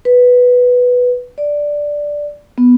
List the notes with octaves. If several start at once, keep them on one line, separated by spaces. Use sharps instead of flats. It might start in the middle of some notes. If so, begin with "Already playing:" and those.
B4
D5
B3